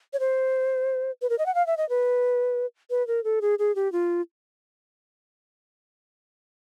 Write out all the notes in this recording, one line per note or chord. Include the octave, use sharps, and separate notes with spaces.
C#5
C5
B4
A#4
D#5
F#5
F5
E5
D#5
B4
B4
A#4
A4
G#4
G#4
G4
F4